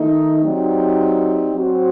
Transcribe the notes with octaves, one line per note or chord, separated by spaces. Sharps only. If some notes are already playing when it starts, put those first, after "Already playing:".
Already playing: D#3 A3 D#4
F#3 C4 D#4 G4 D5
F#3 C4 F#4 C5